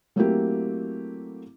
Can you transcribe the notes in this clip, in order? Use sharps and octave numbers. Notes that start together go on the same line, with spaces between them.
F#3 A3 A#3 C4 E4 G4